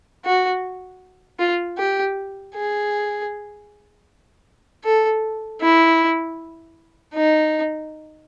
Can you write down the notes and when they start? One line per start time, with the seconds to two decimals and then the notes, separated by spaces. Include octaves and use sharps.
0.25 F#4
1.39 F4
1.78 G4
2.54 G#4
4.84 A4
5.61 E4
7.14 D#4